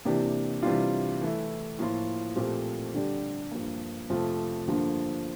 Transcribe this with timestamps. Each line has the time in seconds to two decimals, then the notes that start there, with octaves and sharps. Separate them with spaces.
0.05 C3 E3 A#3 D4 G4
0.63 C3 E3 G3 D4 F4
1.21 E3 A3 E4
1.78 A2 F3 A#3 F4
2.36 A#2 F3 A3 C4 G4
2.94 D3 G3 D4 G4
3.52 G2 F3 A#3
4.10 F2 C3 F3 A3
4.68 G2 D3 F3 A#3